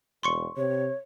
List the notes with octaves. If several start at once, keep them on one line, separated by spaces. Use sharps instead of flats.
E1 C6 C#6 C#7
C3 C#5